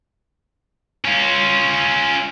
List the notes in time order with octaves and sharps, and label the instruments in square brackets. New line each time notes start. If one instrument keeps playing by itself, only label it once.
[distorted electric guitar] C#4 F4